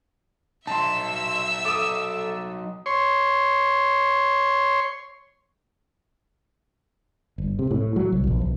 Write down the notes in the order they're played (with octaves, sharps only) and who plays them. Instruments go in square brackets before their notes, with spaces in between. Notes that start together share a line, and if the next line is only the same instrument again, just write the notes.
[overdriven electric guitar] F#3 D#4 [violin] E5 E6 [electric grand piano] A5 C6
[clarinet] A4 [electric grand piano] D6 D#6
[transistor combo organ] C#5 C6
[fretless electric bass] G1
C3
A2
F#3
C2
A#1
B1